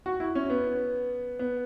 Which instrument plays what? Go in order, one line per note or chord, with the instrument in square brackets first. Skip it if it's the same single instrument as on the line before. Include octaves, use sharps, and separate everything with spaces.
[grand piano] F#4
E4
C#4
B3
B3